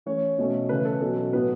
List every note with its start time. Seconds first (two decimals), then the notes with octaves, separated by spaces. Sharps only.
0.06 E3 A3 C#4 C#5
0.38 B2 A3 C#4
0.69 C#3 E3 A3 C#4 B4
0.85 A4
1.01 B2 F#3 C#4 A4
1.33 A2 F#3 B3 B4